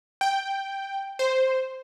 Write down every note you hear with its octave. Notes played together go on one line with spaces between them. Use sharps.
G5
C5